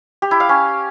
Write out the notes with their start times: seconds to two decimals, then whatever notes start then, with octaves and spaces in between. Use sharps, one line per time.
0.22 G4
0.31 E4
0.40 F5
0.49 C#4